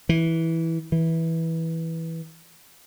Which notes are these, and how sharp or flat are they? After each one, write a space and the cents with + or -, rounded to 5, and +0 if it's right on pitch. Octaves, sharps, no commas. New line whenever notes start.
E3 -10
E3 -10